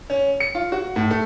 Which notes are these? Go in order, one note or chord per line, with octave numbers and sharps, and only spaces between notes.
C#4
C#7
F4
F#4
A2
A3